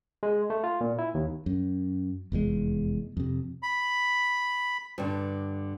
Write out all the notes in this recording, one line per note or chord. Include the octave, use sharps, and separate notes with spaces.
G#3
A3
F4
A#2
E4
D#2
F#2
F1 E2 G2 G#3
F2 C3
B5
G2 D3